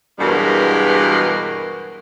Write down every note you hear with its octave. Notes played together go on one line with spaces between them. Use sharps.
E2 G2 B2 F#3 G#3 A#4